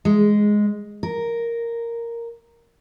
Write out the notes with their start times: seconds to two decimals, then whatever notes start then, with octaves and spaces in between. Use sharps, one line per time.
0.05 G#3
1.03 A#4